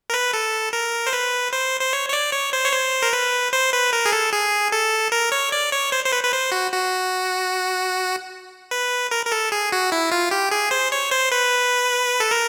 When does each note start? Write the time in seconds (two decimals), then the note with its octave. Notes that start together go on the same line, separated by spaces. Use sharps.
0.10 A#4
0.14 B4
0.33 A4
0.73 A#4
1.07 C5
1.13 B4
1.53 C5
1.81 C5
1.93 C#5
2.09 C#5
2.13 D5
2.32 C#5
2.53 C5
2.65 C#5
2.73 C5
3.02 A#4
3.13 B4
3.53 C5
3.73 B4
3.93 A#4
4.05 G#4
4.12 A4
4.33 G#4
4.72 A4
5.12 A#4
5.32 C#5
5.52 D5
5.72 C#5
5.92 C5
6.05 C5
6.12 B4
6.23 B4
6.33 C5
6.52 F#4
6.72 F#4
8.71 B4
9.11 A#4
9.26 A#4
9.32 A4
9.52 G#4
9.72 F#4
9.92 E4
10.11 F4
10.31 G4
10.51 G#4
10.71 C5
10.92 C#5
11.11 C5
11.32 B4
12.20 A4
12.31 A#4